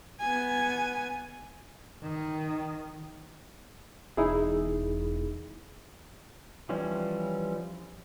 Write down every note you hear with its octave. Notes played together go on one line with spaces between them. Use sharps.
B3 G#5
D#3
E1 D#4 E4 G#4
E3 F3 G3 C#4